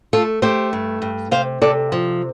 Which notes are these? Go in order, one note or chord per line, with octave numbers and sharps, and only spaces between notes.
A3 F4 A4
A3 G4 C5
G2
G2
C3 C5 F5
C3 A4 D5
F3